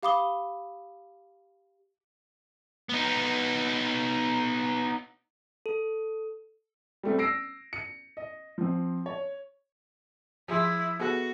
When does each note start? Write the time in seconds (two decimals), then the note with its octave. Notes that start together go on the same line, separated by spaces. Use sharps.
0.03 G4 F5 B5 D6 D#6 G7
2.89 B3 D#4
5.66 A4
7.03 G3 A3 C4
7.19 E6 A#6 C7 D7
7.73 C#7
8.17 D#5
8.58 F3 C4
9.06 C#5
10.48 F3 E4 G#4 C6
11.00 B3 F#4 G#4 A4